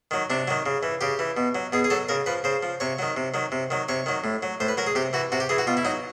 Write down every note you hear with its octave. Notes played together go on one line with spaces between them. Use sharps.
D#3 F#3
C3 D4
D#3 F#3
C#3
E3
C#3 G4
E3
B2
F#3
B2 G#4
G#4
F#3 A4
C#3 A#4
F3 B4
C#3 C5
F3
C3 C#5
D#3 F#3
C3
D#3 F#3
C3
D#3 F#3
C3 C#5
D#3 F#3
A2
F#3
A2 C5
B4
F#3 A#4
G#4
C3 G4
E3 F#4
C3 F#4
G4
E3 G#4
F#4
B2 F4
E4
F#3 D#4